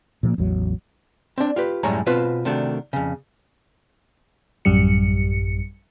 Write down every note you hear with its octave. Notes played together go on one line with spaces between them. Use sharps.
A#2 F3 A3 A#3
A1 E2 F#3
C4 D4
F4 G4 B4
F#2 A2 G3 G#3 C#5 A#5
B2 C4 F4 B4 C5
C3 D#3 A3 D4 F#4
F2 C#3
A1 F#2 G3 C#7